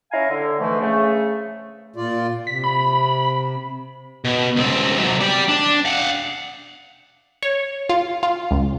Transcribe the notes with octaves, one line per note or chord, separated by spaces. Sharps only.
C#4 E4 F5 G#5 A#5
D3
G#2 D3 E3 F3 A3
C#3 A3
A#2 F4 D5
C3 B6
B5
B2
C#2 C4
C3 F#3
G4 D5
D4
F5 F#5
C#5
F4
F4
C#2